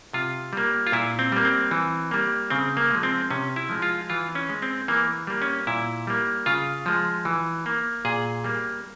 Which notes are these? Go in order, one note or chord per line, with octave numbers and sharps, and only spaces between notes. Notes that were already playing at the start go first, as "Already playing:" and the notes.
C3 F4
G3 A#3
F4
A#2 E4
C4
G3 A#3
C4
E3
G3 A#3
C#3 C4
A#3
F3 G#3
C4
C3 C#4
E4
F3 G#3
F4
E3 F4
C#4
G#3
C4
E3 A#3
G3 A#3
C#4
A#2 E4
G3 A#3
C#3 F4
F3 G#3
E3
A#3
A#2 G#4
G3 A#3